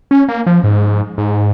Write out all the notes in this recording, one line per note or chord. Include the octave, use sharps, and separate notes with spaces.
C#4
A#3
F3
G#2
G#2